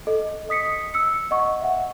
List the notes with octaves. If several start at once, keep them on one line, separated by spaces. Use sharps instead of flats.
A4 D#5
D#5 D#6 B6 C#7
E6 C#7
D#5 F#5 C#6
E5 F#5